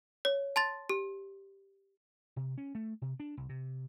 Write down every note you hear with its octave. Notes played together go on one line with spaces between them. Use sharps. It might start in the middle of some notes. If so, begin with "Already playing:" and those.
C#5
A5 C6 A6
G4
C3
C#4
A3
C3
D4
C2
C3